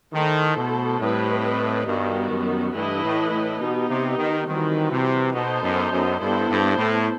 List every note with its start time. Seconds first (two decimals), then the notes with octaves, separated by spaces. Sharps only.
0.13 D#3 A3 E4 A4 C5
0.56 B2
1.00 A2 G3 C4 E4 B4 D#5
1.86 G2 D#3 G3 B3 F#4
2.30 F#2
2.73 G2 E3 A3 E4 B4 D#5
3.03 A2
3.31 A2
3.60 B2 B3 D#4 G4
3.89 C3
4.18 D#3
4.47 D#3 E3 G3 C4 F#4 B4
4.90 C3
5.33 B2 B3 D#4 A4 C5 D#5
5.63 F#2
5.91 F#2
6.20 G2 B3 E4 A4 C5
6.49 G2
6.78 A2